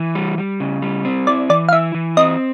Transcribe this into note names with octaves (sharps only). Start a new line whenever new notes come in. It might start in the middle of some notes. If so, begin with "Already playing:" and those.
Already playing: E3
G3
G3
C#3
G3
C4
E4 D5
E3 D5
F5
E4 E5
E3
C4 D#5